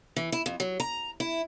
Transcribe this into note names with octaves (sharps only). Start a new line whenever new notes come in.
E3
E4
F2
F#3
A#5
E4